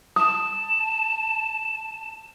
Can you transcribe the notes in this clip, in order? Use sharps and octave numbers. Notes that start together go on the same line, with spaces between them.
A5 D#6